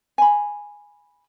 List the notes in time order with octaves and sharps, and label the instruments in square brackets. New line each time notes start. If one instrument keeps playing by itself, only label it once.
[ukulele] G#5 B5